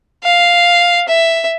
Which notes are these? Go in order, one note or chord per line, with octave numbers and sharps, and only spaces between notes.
F5
E5